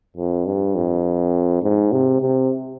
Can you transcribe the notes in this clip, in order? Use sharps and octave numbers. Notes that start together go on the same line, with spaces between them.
F2
G2
F2
G#2
C3
C3